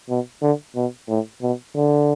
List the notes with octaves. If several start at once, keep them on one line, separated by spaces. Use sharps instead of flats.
B2
D3
B2
A2
B2
D3